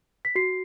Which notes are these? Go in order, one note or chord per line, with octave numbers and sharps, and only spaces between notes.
B6
F#4 C7